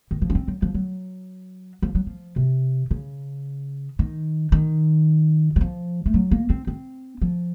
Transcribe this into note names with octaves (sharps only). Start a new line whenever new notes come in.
D#3
F3
C#4
C4
F#3
F3
F#3
F3
F#3
F3
C3
C#3
D#3
D#3
F#3
F3
A3
F#3
A#3
C4
C4
F3